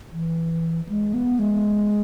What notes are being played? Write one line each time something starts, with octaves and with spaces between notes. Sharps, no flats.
E3
G#3
B3
G#3